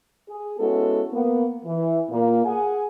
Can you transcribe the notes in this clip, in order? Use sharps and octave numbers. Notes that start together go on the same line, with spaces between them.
G#4
G#3 B3 C#4 E4 F#4 A4
A#3 B3
E3
A#2 A#3
G#4 F#5 G#5